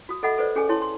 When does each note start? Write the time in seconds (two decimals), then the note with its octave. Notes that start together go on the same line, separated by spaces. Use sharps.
0.09 F#4 D#6
0.23 A4 D#5 E5 F#5 B5
0.38 A4 B4 C5 D5
0.56 C#4 G#4 A4 G#5
0.69 E4 C#5 A5 C6
0.82 C6